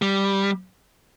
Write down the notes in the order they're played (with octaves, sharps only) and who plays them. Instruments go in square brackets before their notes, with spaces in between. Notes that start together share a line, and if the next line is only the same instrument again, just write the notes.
[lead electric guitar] G3